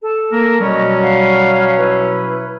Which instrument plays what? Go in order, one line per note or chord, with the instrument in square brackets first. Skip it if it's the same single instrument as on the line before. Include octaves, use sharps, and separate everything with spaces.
[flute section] A4
[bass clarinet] A#3 [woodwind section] A#4
[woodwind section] B2 F#3 C#4 [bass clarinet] G3 [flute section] A#4 D#5
[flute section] F5 F#5
E4 B4